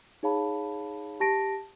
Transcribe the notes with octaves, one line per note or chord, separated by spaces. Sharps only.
D#4 G#4 C#5 F5 A5 B5
G4 A5 A#6 D7